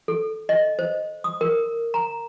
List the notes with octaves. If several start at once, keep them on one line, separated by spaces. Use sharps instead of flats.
A4
D#5
C5
D#6
A#4
A#5